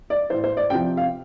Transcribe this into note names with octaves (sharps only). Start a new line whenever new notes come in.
D5
A2 E3 C5
C5
D5
C3 F3 G5
F5